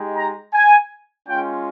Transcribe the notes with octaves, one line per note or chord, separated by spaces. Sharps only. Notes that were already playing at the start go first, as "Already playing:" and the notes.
Already playing: G#3 D#4 G4
A#5
G#5
G#3 C#4 F4 G5